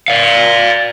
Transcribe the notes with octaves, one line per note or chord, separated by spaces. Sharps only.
D5 F5